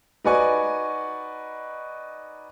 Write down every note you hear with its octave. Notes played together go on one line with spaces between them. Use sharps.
D#4 F#4 B4 D5 G#5 C#6